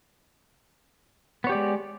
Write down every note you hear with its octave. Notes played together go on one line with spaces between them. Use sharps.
G#3 B3 G4 C#5 D5